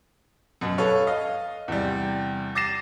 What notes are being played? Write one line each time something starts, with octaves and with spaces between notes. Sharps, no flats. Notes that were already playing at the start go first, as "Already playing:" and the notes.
F#2 B2
A4 B4 C#5 F5
D#5 F5
E2 C3 G3
D6 A6 A#6 C7 E7